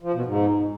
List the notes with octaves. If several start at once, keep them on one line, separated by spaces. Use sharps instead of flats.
F3
B2
G#2